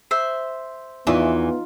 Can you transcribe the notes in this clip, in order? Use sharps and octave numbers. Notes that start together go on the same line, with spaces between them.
C5 E5
E2 E3 B3 D#4 F4